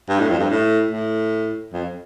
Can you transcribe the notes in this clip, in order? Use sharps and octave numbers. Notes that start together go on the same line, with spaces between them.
G2
A2
F2
G2
A2
A2
F2